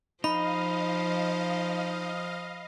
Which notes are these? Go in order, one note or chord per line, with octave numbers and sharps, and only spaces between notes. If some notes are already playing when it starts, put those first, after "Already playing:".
F3 D#4 D#5 F5 B5